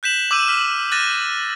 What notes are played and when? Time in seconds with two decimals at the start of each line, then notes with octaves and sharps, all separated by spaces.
0.03 F#6 G6 B6 E7 F#7
0.31 D6 E6 G6 D#7 E7
0.48 F6 B6
0.91 D6 F#6 A6 A#6 D#7 E7